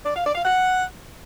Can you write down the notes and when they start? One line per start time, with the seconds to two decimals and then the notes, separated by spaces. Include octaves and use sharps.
0.05 D5
0.15 F5
0.25 D5
0.35 F5
0.45 F#5